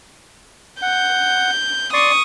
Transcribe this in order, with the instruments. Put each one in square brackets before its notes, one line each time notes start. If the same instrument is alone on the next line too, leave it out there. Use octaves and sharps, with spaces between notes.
[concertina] F#5 [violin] G6
[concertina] D5 C6 [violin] C#6 D#6